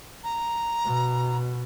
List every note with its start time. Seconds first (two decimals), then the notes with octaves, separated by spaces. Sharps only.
0.24 A#5
0.85 B2